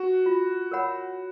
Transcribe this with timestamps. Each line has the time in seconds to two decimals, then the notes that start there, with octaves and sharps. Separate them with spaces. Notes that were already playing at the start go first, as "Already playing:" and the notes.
Already playing: F#4
0.26 F4
0.72 A#4 C#5 F#5 B5